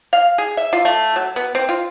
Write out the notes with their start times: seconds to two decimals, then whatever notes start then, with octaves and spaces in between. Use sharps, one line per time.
0.13 F5
0.38 G#4
0.57 E5
0.73 F4
0.85 A3
1.16 F#3
1.36 B3
1.55 C4
1.69 F4